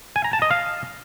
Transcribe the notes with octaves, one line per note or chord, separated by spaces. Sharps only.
G#5
A#5
A5
D#5
F5